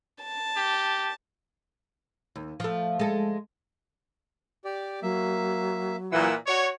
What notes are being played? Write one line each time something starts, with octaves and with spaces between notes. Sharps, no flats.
A5
G4
D#2
F3 A3
G#3 A4
G4 D5
F#3 A#3 E5
A#2 E3 E4 F#5 E6
F#4 C#5 D5 C#6